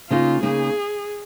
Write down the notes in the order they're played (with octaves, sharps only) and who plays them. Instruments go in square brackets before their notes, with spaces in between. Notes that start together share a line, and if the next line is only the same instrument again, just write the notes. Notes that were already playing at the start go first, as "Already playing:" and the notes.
[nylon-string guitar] C#3 A#3 D#4 [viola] F4
[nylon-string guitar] C#3 A#3 D#4 [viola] G#4